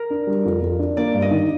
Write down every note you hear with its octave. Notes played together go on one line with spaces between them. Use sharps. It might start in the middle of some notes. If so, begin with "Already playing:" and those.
Already playing: A#4
D4
G3
F2
F2
D4
A#3 D5
G2
D#5
D#3